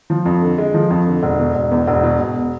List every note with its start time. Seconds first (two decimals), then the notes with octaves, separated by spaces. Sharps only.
0.10 F3
0.26 F2
0.42 D3
0.58 G#3
0.74 F3
0.90 F2
1.07 D3
1.23 E1
1.39 B2
1.55 E1
1.71 E2
1.87 E1
2.03 B2
2.20 E1